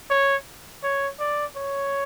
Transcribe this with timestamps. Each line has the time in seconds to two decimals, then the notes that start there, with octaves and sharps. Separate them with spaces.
0.10 C#5
0.83 C#5
1.20 D5
1.57 C#5